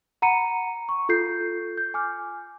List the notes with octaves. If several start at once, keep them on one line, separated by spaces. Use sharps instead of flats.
F#5 A#5 B5 C#7 D#7
C#6
F4 A4 G6 C7
G6
G#5 D6 F6